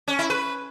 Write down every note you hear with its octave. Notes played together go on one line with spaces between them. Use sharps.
C#4
E4
B4